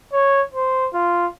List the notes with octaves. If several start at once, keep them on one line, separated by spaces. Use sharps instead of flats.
C#5
C5
F4